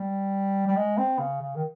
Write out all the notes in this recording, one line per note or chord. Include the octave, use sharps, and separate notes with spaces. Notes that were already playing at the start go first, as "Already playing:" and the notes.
Already playing: G3
G3
G#3
C4
C#3
C#3
D#3